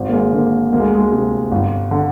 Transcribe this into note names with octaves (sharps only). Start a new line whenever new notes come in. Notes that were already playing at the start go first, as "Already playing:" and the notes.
Already playing: G#1
A#3
G#3
D3 A#3
D2 A#3
G#3
G#3
C3
G1
D3